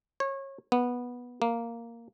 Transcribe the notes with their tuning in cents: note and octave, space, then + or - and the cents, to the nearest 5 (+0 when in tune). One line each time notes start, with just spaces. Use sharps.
C#5 -25
B3 -10
A#3 -5